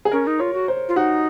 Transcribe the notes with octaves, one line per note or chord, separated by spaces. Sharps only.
G#4
C#4 A#4
D#4
F4 C#5
F#4
C5
F4
D#4 F#4